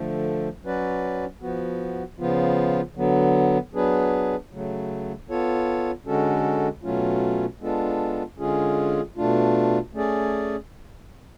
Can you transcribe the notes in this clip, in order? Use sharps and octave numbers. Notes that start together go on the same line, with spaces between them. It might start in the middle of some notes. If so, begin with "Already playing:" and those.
Already playing: D3 F3 A3
F#3 C#4 F#4 B4 D5
F3 B3 F#4
C#3 F3 B3 F4
D3 F#3 B3
F#3 B3 D4 G#4 B4
C#3 F#3 A3
B3 F4 A4 C#5
D3 G#3 C#4 F#4 A4
B2 F#3 A3 C#4 F4
G#3 B3 D4 F4 A4
D3 G#3 C#4 F4 G#4
B2 A3 D4 F4
A3 C#4 G#4 D5